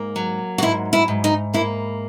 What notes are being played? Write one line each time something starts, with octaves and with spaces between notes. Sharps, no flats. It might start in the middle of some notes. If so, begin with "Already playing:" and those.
Already playing: G#2 A#3
F#3
F#4
G#2 E4
E4
G#2
D#4
A#3 E4